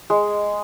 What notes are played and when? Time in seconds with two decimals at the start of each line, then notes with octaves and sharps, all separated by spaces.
0.10 G#3